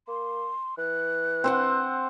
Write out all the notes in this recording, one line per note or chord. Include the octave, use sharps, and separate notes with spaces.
A#3 C6
E3 F#6
C4 C5 F#5